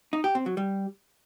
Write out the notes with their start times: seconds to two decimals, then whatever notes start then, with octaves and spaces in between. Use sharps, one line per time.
0.13 D#4
0.24 G4
0.35 C4
0.46 F#3
0.57 G3